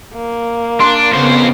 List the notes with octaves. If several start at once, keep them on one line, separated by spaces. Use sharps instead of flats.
A#3
D4 C6
F2 C#3 B3 C5